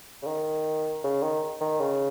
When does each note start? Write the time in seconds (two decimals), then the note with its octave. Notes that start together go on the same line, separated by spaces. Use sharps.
0.22 C#3
0.26 D#3
1.03 C#3
1.22 D#3
1.61 D#3
1.80 C#3